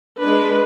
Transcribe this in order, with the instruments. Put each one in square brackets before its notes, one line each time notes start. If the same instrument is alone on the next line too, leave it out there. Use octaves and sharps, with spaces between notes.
[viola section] G#3 D4 B4